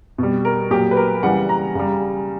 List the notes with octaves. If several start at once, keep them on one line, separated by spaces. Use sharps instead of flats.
B2 G3
A#4
A#2 F#3 G4
B4
A#4
C#3 E3 G3 F#5
A#5
C#3 G3